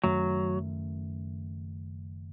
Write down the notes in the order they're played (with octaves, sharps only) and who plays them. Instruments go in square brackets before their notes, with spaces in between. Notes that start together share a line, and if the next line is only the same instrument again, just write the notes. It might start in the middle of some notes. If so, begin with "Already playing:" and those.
[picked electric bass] F#1 F#2 D#3 A3 [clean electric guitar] F#3